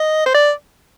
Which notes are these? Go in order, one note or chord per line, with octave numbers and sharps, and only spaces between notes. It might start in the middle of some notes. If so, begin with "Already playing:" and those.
Already playing: D#5
C5
D5